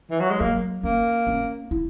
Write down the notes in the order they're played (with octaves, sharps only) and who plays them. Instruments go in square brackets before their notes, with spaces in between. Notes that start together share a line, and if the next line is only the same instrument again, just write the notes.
[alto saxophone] E3
F#3
G#3
[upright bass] F#3 [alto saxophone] A#3
[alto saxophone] A#3 [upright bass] C#4
[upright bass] C#4
E4